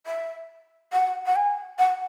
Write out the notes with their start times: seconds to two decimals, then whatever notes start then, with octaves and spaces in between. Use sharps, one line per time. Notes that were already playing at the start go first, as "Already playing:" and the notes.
0.06 E5
0.93 F#5
1.26 F#5
1.36 G#5
1.79 F#5